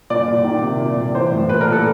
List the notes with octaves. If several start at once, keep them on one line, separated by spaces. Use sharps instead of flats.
A#2 D5
A#2
D#3
C3
A#2
A#2
E3 C5
A2
A#2 B4
A#4
A#2
A4